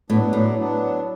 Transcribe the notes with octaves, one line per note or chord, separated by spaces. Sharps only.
A2 F#3 B3 D4
A2
F#3 B3 D4